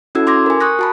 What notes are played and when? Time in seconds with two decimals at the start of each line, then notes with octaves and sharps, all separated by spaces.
0.15 C#4 E4 F#4 A4 E6 G#6
0.27 C6 D6 G#6 A#6
0.46 A#4 G#5
0.60 C#6 D#6 F#6 A#6
0.79 F#4 A5 B5